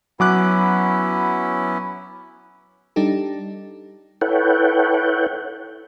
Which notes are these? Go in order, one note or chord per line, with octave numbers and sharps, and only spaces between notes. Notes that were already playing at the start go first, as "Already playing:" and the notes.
F#3 B3 C#4 E4 D6 F#6
G3 D4 D#4 G4 A4
E4 A4 B4 C#5 F#5 G5